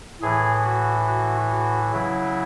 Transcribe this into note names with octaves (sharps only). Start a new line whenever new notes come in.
A2 E3 G#4
F#4
F#4
F#4
C#3 F#3 E4